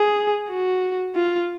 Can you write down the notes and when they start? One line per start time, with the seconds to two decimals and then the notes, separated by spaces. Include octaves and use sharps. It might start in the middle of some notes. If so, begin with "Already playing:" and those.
Already playing: G#4
0.50 F#4
1.15 F4